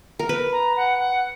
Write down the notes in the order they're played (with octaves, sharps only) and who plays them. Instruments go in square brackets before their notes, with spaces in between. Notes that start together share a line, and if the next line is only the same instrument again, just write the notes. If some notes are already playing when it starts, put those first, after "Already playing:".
[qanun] A#4
B4
[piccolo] A#5
F#5
F#5